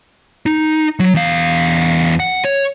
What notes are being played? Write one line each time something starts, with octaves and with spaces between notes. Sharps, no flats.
D#4
F#3
E2 F5
F#5
C#5